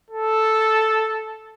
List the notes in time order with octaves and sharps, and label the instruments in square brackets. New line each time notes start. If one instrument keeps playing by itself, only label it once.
[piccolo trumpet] A4